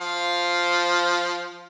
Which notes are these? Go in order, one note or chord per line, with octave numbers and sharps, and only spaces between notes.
F3 F5